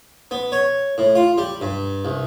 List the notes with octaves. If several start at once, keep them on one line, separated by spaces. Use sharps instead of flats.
B3
C#5
A2
F4
G3
G2
C2